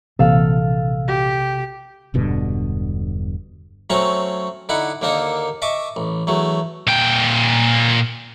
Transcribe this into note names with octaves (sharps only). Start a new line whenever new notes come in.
A#1 C3 E3 A#3 A4 F5
G4
E1 G2 B2 D3
F#3 A3 C4 C#4 A#5 C#6
D3 D#4 E4 F#5
D#2 D3 A#3 D#4 A4
D#5 E5 A5 C#6 D6
A1
E2 F#3 A3
A#2 G5